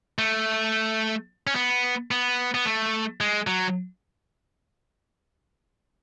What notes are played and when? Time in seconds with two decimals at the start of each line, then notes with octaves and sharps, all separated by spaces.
0.19 A3
1.47 C#4
1.55 B3
2.11 B3
2.55 B3
2.65 A3
3.21 G#3
3.47 F#3